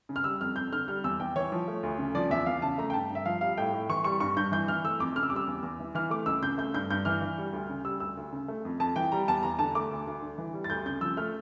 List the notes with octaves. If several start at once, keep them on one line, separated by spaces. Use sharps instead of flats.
C#3
F6
G3 E6
F2 F6
F2 G6
D3 F6
G3 F6
E2 E6
E2 G5
E3 C#5
F3
A3
D2
C#3
F3 D5
E2 E5
E2 F5
C#3 A5
A3 A#5
G5
G2 A5
G2
E5
F3 F5
G3 F5
A2 G5
A2
E3 C#6
G3 C#6
G2 C#6
G2 G6
E3 G6
E3 F6
A3 E6
F2 D6
C#3 F6
E6
G3 D6
E6
E2
E2
E3
E3 F6
A3 D6
C#2 E6
C#3 G6
A3 G6
G2 G6
G2 G6
E3 F6
E3
G3
D2
C#3
G3 E6
D2 E6
D2
C#3
A3
F2
F2 A5
E3 G5
G3 A#5
E2 A5
E2 A#5
D3 A5
A3 D6
D2
D2
D3
E3
G3
A6
D2 G6
C#3 G6
F3 E6
A3 F6